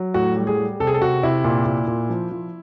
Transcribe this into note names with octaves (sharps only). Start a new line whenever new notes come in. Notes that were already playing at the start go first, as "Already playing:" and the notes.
Already playing: F#3
A2 F#4
G3
G#4
G3
C3 A4
G#4
A4
C3 F#4
C3 E4
A#2
A#2
A#2
F3
F3